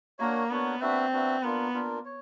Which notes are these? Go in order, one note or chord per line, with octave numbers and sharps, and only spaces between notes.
A#3 D4 F#4 A#4 C#5
B3 D4 F#4 A#4 C#5
C4 D4 F#4 B4 E5
D4 F#4 B4 E5
A#3 B3 D4 F4 A#4
A#3 D4 F4 A#4
C#5